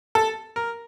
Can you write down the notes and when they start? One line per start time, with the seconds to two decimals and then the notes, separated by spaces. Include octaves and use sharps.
0.15 A4
0.56 A#4